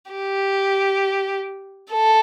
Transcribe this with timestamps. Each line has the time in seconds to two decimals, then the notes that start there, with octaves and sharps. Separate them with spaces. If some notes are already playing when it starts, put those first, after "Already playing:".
0.11 G4
1.92 A4